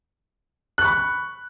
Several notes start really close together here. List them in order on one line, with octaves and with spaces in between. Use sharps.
F#6 C#6 B5